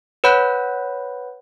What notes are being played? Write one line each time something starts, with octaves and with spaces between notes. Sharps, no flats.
B4 C#5 F#5 B5 F#6 G6